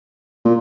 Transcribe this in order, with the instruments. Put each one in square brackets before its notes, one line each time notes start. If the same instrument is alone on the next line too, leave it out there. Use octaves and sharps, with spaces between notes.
[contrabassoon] A#2